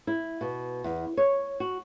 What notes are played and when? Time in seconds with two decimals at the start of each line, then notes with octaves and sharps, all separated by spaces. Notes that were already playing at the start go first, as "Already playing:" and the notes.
0.07 E4
0.41 B2
0.84 E2
1.17 C#5
1.60 F#4